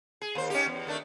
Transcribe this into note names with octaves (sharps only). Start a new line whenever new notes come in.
G#4
D#2 C5
C#4 D#4 G4
E2
D#3 A3 D4